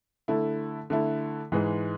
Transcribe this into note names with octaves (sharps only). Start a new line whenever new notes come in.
D3 A3 E4
D3 A3 E4
G#2 E3 G#3